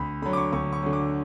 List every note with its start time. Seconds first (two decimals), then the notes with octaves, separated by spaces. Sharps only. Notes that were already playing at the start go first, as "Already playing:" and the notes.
Already playing: D2 B5
0.22 D3 F#3 B5
0.33 D6
0.37 C#6
0.52 D2 C#6
0.72 C#6
0.83 D3 F#3
0.93 D6